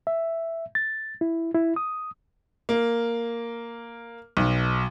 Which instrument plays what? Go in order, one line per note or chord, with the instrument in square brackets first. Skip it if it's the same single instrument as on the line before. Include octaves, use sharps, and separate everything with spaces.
[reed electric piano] E5
A6
E4
E4
D#6
[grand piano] A#3
B1